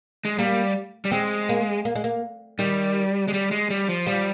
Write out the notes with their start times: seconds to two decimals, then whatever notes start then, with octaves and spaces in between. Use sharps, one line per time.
0.25 G#3
0.39 G3 A#3
1.05 G3
1.12 G#3 C4
1.49 A#3
1.85 A#3
1.95 G#3
2.04 A#3
2.59 D#3 G3
3.28 G#3
3.34 G3
3.51 G#3
3.70 G3
3.89 F3
4.07 F3 G3